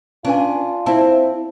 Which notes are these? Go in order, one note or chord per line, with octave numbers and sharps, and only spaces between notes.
C#4 D4 F4 B4 G#5
C4 E4 A5